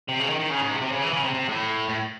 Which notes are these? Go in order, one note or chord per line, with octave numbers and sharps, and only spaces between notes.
C3
C#3
D#3
D#3
C#3
G#2
C3
C3
C#3
E3
C#3
C3
C3
A2
A2